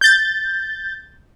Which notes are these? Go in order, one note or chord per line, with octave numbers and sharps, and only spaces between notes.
G6 A6